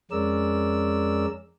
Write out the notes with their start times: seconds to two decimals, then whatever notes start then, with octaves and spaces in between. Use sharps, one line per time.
0.11 F2 G#3 C#4 A#4 D5 E6